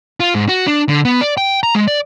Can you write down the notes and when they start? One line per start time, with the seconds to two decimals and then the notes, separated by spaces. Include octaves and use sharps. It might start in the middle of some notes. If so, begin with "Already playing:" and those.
0.20 F4
0.35 G#2
0.49 F#4
0.67 D4
0.89 D3
1.05 B3
1.21 D5
1.37 G5
1.63 A#5
1.75 G#3
1.88 D5